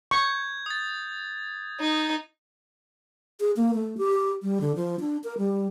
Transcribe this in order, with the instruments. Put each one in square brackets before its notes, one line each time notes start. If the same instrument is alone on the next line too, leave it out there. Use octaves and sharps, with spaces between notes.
[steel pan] C#6 [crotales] G6 G#6
[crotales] D#6 A6
[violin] D#4
[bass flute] G#4
A#3
A3
G4
G3
D3
F3
D4
A#4
G3